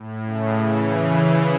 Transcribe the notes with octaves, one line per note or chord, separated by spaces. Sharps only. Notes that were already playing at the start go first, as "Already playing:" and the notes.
Already playing: A2
C#3
C#3 E3